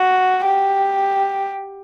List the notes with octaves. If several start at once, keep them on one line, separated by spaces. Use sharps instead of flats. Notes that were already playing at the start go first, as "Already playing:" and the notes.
Already playing: F#4
G4